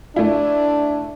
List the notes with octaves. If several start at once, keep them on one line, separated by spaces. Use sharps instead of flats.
A3 D4 E4